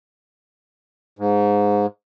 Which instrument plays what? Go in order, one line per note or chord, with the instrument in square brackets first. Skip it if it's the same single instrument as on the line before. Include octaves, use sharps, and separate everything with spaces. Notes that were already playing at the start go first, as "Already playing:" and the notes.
[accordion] G#2